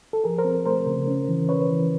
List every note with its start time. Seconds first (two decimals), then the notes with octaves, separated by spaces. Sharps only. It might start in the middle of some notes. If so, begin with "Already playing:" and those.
0.13 A4
0.24 F3 G#4 A#4
0.38 A#4 C5
0.45 C4
0.65 A3 A#4 C5
0.86 C#3
1.08 C#4
1.29 E3
1.49 C#4 B4 C#5
1.71 E3